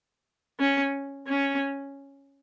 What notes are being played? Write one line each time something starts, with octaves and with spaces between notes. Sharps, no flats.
C#4
C#4